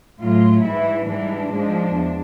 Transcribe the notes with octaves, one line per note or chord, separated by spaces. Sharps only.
A2 F#3 A3 F4
G#2 E3 G3 E4
G#2 E3 G3 D4
G#2 F3 G#3
E2